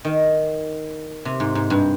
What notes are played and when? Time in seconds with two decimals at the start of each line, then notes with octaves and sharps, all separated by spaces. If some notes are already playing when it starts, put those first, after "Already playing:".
0.05 D#3
1.25 C3
1.40 G#2
1.55 G#2
1.70 G2